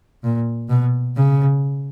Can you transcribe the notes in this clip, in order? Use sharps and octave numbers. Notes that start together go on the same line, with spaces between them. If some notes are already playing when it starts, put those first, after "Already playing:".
A#2
B2
C#3